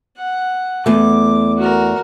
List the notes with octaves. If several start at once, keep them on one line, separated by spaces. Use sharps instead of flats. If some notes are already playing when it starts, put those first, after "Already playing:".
F#5
E2 A3 D6
F#4 A#4